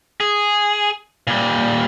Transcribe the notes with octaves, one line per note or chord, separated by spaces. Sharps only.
G#4
A#2 G3